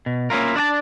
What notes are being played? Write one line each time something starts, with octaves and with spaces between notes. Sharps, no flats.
B2
A#3 C#4 E4 F4 A#4
D4 D5 G5 A5